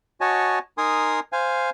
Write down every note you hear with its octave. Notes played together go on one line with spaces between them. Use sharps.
F#4 C#5 D#5 G#5 A5
D#4 A#4 G#5 C6 D#6
C5 F5 G#5